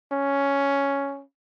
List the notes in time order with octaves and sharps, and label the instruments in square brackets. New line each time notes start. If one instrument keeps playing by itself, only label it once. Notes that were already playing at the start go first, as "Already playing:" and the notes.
[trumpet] C#4